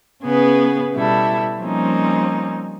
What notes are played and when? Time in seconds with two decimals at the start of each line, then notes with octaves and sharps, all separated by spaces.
0.22 C#3 B3 G#4 B4
0.93 B2 G3 E4 A4
1.60 F3 G3 A#3 C4 C#4 D#4